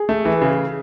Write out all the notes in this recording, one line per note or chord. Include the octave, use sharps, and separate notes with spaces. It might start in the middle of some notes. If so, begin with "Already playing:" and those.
Already playing: G#4
A3
E3
C#3